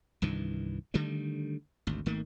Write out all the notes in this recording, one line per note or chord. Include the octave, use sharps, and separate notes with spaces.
C2 G2 D#3 E3
D3 D#3 G3 A3
G#1 D2
G#1 D#3 A3 A#3